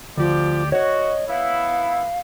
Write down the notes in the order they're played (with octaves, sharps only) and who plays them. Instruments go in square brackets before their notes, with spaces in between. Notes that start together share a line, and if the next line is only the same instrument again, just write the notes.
[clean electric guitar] D2 [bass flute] F3 [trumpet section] G4 D5
[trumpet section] F#4 [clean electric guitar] C#5 [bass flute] D#5
[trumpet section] B3 E4 [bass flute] F5